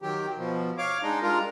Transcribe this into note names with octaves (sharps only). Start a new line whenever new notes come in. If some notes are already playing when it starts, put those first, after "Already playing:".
D#3 F#3 G4
B2 F3
C#5 F5 D6
G#3 D4 D#4 D#5
G3 G#3 D4 F4 A#4